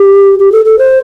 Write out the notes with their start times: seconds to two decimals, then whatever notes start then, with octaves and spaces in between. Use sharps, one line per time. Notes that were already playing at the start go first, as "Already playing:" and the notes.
Already playing: G4
0.39 G4
0.52 A4
0.65 A4
0.78 C5